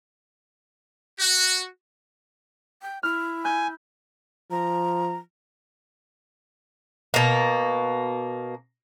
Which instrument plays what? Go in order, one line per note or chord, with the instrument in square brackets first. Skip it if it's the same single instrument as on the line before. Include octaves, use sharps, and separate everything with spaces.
[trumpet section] F#4
[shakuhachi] G5
[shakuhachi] E4 [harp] F6
[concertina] G#5 [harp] G6
[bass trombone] F3 [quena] A#5
[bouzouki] B2 A#3